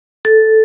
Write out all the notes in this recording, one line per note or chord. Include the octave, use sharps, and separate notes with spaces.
A4